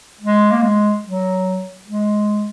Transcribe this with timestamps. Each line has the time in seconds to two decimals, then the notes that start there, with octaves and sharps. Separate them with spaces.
0.21 G#3
0.51 A#3
0.62 G#3
1.04 F#3
1.87 G#3